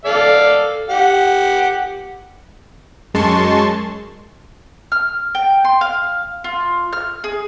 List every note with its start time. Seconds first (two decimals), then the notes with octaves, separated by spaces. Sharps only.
0.05 A4 D5 F5
0.90 G4 F#5
3.14 F#2 G#3 A5 C6 C#6
4.92 F6
5.35 G5
5.65 C6
5.81 F5
6.44 F4
6.93 F6
7.24 G#4